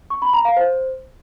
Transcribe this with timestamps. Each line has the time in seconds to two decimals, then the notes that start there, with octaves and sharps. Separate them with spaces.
0.10 C#6
0.22 B5
0.34 A#5
0.45 F5
0.57 C5